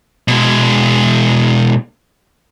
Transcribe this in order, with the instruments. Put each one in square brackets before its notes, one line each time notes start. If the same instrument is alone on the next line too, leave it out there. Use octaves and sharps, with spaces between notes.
[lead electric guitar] B2 G#3